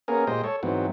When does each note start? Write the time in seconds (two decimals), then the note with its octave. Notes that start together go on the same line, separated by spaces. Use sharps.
0.08 A#3 B3 C#4 G#4 A#4
0.27 A#2 G#3 G4 C5 D#5
0.44 A4 C#5
0.63 G#2 E3 F#3 B3 C4